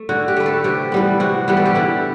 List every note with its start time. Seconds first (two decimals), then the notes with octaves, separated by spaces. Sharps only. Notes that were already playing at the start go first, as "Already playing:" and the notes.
Already playing: A3
0.09 D3 F#4
0.28 G4
0.36 A3 B4
0.46 A4
0.64 C3 G4
0.92 E3 G3 B3
1.20 C3 F#4
1.48 E3 G3 B3 G4
1.57 A4
1.65 G4
1.75 D3 E4